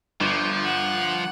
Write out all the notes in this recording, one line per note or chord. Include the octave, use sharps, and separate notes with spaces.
G1 F3
F#5